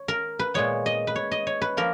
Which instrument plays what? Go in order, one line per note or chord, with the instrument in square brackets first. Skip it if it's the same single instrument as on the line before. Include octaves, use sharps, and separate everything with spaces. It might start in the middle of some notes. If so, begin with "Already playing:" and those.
Already playing: [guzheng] C#5
A#4
B4
A#2 G#3 B3 C#5
D#5
B4
C#5
D#5
C#5
B4
F3 A#3 A#4